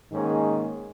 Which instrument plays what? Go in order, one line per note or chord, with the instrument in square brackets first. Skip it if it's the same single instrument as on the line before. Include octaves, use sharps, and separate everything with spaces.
[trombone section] G#2 D#3 A#3 C#4 G#4